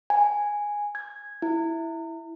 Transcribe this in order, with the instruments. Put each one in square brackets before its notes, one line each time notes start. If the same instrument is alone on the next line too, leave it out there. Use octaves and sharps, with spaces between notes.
[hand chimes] G#5
G#6
E4